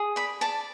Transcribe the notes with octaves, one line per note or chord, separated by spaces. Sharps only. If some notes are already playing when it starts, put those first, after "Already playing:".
Already playing: G#4
D5 B5
D5 A5